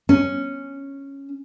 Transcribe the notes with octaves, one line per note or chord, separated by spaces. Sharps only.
C#4